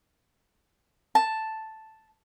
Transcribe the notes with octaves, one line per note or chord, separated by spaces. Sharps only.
A5